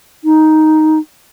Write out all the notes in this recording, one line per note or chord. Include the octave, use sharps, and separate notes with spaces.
D#4